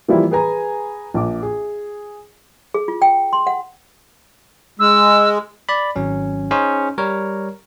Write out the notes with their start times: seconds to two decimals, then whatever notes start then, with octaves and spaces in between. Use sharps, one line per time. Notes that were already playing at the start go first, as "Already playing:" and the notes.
0.08 E3 F3 G3 A#3 E4 F4
0.31 G#4 B4 G#5 A#5
1.14 A#1 D6
1.43 G#4
2.74 G#4
2.88 F4
3.02 G5
3.33 C6
3.47 F#5
4.79 G#3 E6
5.69 D5 B5
5.96 G#1 F#3 C#4
6.51 C#4 D#4 G#4 C5
6.98 G3 A#4 C#5